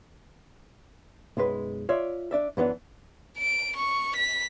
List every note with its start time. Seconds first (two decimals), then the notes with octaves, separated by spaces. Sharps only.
1.37 B1 F#2 G#3 B4
1.89 F4 C#5 D5 E5
2.31 D4 D5 E5
2.57 F#2 E3 B3 D4
3.38 D7
3.76 C#6
4.16 B6